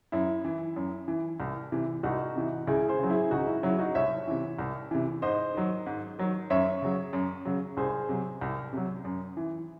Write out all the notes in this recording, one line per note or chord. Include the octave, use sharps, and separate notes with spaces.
F#2 E4
E3
F#2
E3
C2
C3 E3
C2 D#4 F#4
C3 E3
C#2 E4 G#4
G#4 C5
C#3 F#3
E4 G#4
C#2 D#4 F#4
E4
C#3 F#3 E4
D#4 F#4
C2 C#5 E5
C3 E3
C2
C3 E3
G#2 C5 D#5
D#3 F#3
G#2
D#3 F#3
F#2 C#5 E5
C#3 F#3
F#2
C#3 F#3
C2 G#4 C5
C3 F#3
C2
C3 F#3
F#2
E3